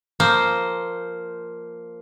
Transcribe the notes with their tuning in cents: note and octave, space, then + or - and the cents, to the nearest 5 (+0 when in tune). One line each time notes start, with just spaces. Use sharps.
F3 +0 A#3 +0 C5 +0